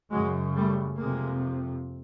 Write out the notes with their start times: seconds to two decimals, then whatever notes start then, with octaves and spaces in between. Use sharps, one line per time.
0.11 F#2 C#3 F#3 G#3
0.56 G3 A3
1.00 F2 C3 G#3 A#3